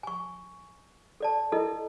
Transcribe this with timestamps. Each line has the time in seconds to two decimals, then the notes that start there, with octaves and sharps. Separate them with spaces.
0.03 G#5 C#6
1.20 A4 D5 A5
1.52 E4 A4 A#4 D#5